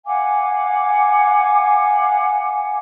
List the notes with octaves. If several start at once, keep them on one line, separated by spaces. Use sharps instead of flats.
F5 F#5 G#5 D6